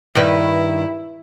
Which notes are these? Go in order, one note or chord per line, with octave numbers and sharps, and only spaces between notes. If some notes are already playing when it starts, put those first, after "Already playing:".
G2 D#3 E4 B4